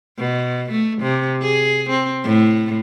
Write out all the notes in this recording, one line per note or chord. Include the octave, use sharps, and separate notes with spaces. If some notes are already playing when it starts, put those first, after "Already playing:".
B2
A3
C3
G#4
C4
A2